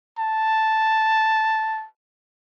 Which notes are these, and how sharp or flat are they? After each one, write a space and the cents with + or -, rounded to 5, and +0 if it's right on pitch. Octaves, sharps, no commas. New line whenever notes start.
A5 +0